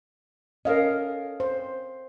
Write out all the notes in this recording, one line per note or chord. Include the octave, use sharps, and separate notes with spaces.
C#4 A4 A#4 D#5 F5
C5